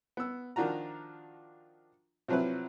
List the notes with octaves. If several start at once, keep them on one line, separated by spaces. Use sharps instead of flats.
B3 E6
D#3 F3 D4 F4 F#4 A#5
C3 F3 F#3 C4 E4 B4